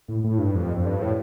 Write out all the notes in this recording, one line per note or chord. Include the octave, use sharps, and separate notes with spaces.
A2
A2
G2
F2
F2
G2
A2